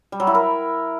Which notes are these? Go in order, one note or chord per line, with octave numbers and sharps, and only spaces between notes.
G3
F#3
E4
A#4